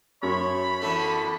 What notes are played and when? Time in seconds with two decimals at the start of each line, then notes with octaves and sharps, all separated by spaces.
0.23 F#2 A3 C#5 B5
0.82 E2 D3 A3 D4 F#4 A4